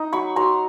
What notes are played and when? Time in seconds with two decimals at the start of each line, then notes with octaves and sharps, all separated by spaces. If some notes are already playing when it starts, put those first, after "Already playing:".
Already playing: D#4
0.13 F#3 B5 C#6
0.36 F#3 A#5 C6